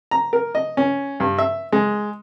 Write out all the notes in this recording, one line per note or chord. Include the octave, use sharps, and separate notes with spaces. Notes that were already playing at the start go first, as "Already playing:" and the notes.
A#5
A#4
D#5
C#4
G2
E5
G#3